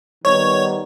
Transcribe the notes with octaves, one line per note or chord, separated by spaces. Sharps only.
D#3 G3 B3 C#5